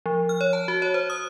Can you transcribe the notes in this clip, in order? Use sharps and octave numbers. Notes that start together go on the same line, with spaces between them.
F3
F6
C#5
A5
F#4
C#5
C5
D#6